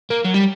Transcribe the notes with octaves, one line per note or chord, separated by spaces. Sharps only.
A#3
F#3
G3